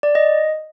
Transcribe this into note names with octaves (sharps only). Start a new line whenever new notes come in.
D5
D#5